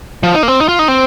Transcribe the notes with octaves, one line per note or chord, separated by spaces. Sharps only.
F3
D#4
A#3
C4
D#4
F4
D#4
C4